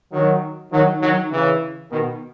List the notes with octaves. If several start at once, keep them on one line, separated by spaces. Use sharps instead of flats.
D#3 F#3
D#3 F#3
D#3 F#3
C#3 E3
B2 D#3